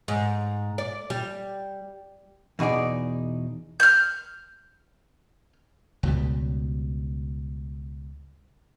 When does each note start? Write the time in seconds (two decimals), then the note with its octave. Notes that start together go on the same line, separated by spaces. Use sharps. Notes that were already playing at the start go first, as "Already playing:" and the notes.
0.08 G#2
0.78 D5
1.10 G3
2.59 E2 B2 D#4 G#4 D5
3.80 F6 G6
6.03 C#2 B2 G3